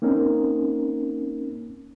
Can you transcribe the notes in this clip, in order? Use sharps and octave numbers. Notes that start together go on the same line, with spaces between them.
A#3 C4 C#4 D#4 A#4